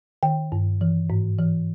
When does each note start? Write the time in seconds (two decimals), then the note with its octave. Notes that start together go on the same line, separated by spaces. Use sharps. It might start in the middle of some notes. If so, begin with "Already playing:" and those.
0.23 D#3 G5
0.52 G2
0.81 E3
1.10 G#2
1.39 E3